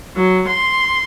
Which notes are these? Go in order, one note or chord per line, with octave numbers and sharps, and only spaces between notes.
F#3
C6